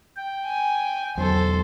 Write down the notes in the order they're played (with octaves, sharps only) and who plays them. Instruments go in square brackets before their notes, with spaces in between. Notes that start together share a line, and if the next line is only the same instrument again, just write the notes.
[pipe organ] G5
[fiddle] G#5
[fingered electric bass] E1 E2 F#3 [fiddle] A4 C5